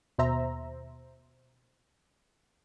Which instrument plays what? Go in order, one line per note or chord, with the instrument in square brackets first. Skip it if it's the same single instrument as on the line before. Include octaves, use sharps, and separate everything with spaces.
[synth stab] D#2 B2 C5 E5 A#5